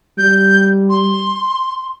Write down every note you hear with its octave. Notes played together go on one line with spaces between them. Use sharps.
G3 G6
C6